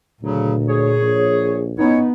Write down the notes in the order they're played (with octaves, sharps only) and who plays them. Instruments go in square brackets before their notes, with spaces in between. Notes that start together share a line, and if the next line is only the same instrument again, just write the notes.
[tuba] D2 [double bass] A#2 [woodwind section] C#3 F#3
[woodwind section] G#4 [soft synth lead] C#5
[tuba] A#1
[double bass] B3 [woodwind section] C#4 E4 C#5 [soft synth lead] D#4